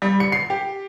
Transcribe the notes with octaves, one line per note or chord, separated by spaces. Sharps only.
G3
C#7
C7
G4